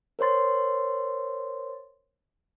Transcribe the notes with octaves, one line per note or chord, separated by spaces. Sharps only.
A#4 C5 C#5 C6 A6